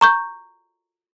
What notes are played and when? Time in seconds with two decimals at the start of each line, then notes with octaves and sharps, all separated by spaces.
0.01 A#5 C#6 G6